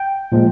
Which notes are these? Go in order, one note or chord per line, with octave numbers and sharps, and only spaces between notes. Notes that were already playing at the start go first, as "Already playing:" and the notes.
Already playing: G5
A#2 F3 G#3